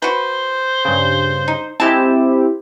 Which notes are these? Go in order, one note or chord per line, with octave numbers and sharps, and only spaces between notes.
F#4 B4 C5
G2 C#3
D#4
G#3 C4 E4 G4 A5